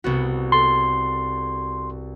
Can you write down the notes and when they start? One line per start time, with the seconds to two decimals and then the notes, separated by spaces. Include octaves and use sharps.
0.04 C2 B3 F#4
0.52 A4 C6